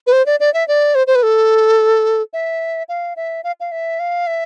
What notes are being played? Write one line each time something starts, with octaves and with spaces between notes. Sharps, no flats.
B4
C5
D5
D5
E5
D5
C5
C5
B4
A4
E5
F5
E5
F5
F5
E5
F5
E5